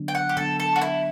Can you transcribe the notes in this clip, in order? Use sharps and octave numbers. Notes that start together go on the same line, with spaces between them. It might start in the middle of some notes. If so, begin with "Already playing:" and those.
Already playing: D3 F#3 B3 D4
G5
F#5
G4
D3 F#3 B3 D4 A4
A4
F#4
E4